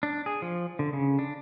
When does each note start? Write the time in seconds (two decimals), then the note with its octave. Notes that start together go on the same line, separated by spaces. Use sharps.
0.03 D4
0.26 G#4
0.42 F3
0.79 D3
0.93 C#3
1.19 D4